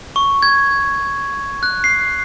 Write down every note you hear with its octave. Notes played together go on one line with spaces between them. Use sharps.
C#6
G#6
F#6
C7